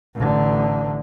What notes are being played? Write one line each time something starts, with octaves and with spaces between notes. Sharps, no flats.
A1 D3